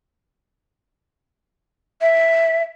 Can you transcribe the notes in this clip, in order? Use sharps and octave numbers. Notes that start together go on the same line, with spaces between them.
E5